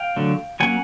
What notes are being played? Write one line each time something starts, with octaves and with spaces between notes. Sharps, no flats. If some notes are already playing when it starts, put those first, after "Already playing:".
Already playing: F5 G5
D3 F#3 A3
F#3 A#3 C#4 F#5 G#5